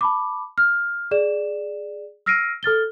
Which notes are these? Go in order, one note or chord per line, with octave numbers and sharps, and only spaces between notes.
A5 B5 D6
F6
G#4 D5 E7
E6 F6 A#6 C7 D7 D#7
A4 F6 A6 G7